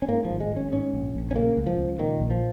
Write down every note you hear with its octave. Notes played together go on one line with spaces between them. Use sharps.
C#4
G#2 A#3
F3
G#1
G#3
G#1
C#4
G#2 C#4
A#1
A#1
C#4
C#3 A#3
C#2
F3
C#2
A#2 D#3
A#1
F3